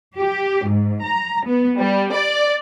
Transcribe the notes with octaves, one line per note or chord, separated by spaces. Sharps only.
G4
G#2
A#5
B3
G3
D5